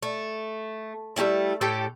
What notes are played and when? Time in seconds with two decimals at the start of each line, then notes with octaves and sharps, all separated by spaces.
0.03 A3
1.16 G3 A3 C#4 E4
1.61 A2 G4 A4 G5